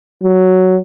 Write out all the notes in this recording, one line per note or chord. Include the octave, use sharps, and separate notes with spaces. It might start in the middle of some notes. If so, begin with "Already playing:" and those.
F#3